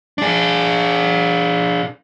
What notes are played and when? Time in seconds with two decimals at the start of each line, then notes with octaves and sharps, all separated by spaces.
0.18 D4 G#4